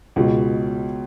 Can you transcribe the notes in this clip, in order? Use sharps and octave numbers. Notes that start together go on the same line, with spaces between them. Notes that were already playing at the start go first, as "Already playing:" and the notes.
C#2 B2 G#3